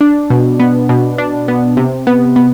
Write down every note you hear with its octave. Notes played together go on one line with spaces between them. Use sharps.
D4
B2
B3
B2
D4
B3
C3
B3
B3